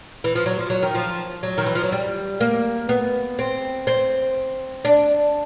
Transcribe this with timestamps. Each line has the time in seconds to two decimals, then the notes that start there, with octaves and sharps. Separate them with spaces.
0.24 E3
0.35 F3
0.46 F#3
0.59 F3
0.70 F#3
0.83 D#3
0.95 F3
1.43 F#3
1.58 D#3
1.66 E3
1.75 F3
1.84 F#3
1.92 G3
2.41 A#3
2.89 B3
3.39 C4
3.87 C4
4.85 D4